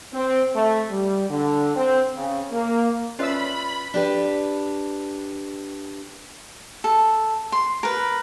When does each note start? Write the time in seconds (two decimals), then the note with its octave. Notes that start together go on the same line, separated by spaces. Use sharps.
0.14 C4
0.55 A3
0.90 G3
1.30 D3
1.76 C4
2.16 C#3
2.51 A#3
3.19 C#4 F4 B4 D5 E5 B5 E6
3.94 D4 G4 B4
6.84 A4
7.52 C6
7.83 A#4 B4